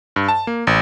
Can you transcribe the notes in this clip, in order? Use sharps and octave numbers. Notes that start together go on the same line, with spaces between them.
G2
A5
A#3
A1